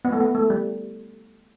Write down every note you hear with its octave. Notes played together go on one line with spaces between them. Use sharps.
B3
A3
B3
A3
G3